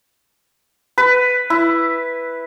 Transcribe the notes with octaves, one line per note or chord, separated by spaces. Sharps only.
B4
E4